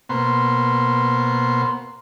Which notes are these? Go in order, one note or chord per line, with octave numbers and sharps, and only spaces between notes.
B2 A#3 B3 C5 C6